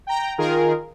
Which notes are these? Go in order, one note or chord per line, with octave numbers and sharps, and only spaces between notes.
G5 A#5
D#3 F4 G#4 A#4